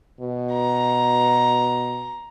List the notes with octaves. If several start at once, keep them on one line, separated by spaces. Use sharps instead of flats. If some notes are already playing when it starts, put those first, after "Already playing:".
B2
A#5